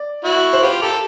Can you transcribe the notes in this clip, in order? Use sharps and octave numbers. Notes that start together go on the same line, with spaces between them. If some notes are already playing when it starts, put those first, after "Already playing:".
Already playing: D5
E4 F#4
C5
F4 G4 B4
G4 A4 A#4